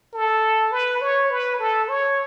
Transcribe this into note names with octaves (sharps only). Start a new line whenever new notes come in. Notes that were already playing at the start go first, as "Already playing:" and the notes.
A4
B4
C#5
B4
A4
C#5